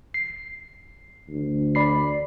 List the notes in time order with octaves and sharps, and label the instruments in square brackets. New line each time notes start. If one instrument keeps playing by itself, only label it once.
[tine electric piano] C7
[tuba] D2
[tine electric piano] D5 B5 C7